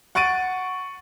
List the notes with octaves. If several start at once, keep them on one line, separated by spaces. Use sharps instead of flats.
F#5 C#6 A6 D7 D#7